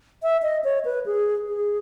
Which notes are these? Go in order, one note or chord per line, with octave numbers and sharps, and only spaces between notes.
E5
D#5
C#5
B4
G#4
G#4